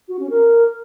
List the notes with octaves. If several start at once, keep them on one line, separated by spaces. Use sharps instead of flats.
F#4
C#4
A#4